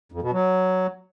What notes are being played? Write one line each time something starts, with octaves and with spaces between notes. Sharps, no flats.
F2
B2
F#3